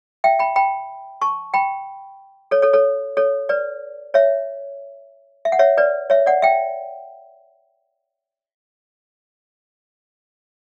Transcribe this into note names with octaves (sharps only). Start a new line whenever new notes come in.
E5 G5
G5 B5
G5 B5
A5 C#6
G5 B5
A4 C#5
A4 C#5
A4 C#5
A4 C#5
B4 D5
C#5 E5
E5
F#5
C#5 E5
B4 D5
C#5 E5
D5 F#5
E5 G5